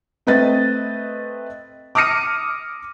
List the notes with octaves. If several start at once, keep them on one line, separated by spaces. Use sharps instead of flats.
A3 C4 B4 D#5 A6
D6 D#6 F6 A#6 C#7 D#7